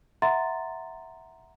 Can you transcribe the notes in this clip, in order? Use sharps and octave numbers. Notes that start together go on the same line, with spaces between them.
E5 F#5 A#5 C6 A6